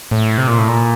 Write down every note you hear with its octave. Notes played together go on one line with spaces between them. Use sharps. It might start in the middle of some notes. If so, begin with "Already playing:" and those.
A2
C3
A#2
A2
A#2